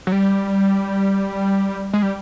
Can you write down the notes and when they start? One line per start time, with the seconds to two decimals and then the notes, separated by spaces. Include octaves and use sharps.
0.07 F#3
0.12 G3
1.93 G#3
2.02 G3